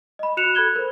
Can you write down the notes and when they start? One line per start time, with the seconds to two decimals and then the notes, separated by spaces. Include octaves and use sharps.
0.19 D#5 B5
0.37 F#4 F#6 C#7 E7 F7
0.55 A4 B5 F#6 G#6 G7
0.76 A#4 C5